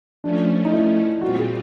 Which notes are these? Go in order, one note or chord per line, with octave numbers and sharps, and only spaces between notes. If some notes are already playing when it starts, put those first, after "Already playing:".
F3 A3 C#4 D4
D#4
E4
A#2 G3 C4 F4 F#4
G#4